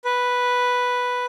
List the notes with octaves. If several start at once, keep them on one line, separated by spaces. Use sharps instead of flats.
B4